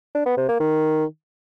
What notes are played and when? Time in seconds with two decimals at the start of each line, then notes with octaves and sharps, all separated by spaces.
0.15 D4
0.26 B3
0.37 C3
0.49 A#3
0.60 D#3